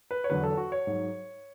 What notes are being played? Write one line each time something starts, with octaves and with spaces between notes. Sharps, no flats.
B4
C#5
E2 D3 F#3 B4
A4
F#4
C#5
G#2 F#3